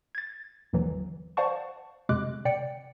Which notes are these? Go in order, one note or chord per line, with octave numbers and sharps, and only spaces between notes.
G#6 A6
G1 D#2 D3 E3 F#3
C5 D5 F5 F#5 A5 C#6
F2 C3 G#3 D6 F#6
C3 D5 G5 C#7